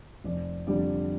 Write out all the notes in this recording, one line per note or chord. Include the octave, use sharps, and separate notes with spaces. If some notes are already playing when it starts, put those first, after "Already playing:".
F1 D5
F2 D3 G3 D5